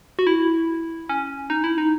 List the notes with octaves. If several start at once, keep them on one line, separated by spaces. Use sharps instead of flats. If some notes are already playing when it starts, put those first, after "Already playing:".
F#4
E4
C#4
D#4
E4
D#4